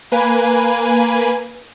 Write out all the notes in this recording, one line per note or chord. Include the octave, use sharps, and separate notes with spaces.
A#3 B4 G#5